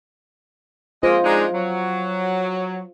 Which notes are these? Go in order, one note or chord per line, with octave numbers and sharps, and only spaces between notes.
G#3 A#3 F4 C5 D#5
G#3 D4 D#4
F#3